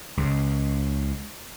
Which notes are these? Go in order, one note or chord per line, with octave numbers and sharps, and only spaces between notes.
C#2 C#3